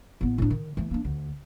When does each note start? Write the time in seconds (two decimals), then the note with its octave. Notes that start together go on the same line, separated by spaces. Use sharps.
0.21 A1 B3
0.38 A2 D4
0.51 D#3
0.77 E3 A3
0.91 A#3 D4
1.05 D2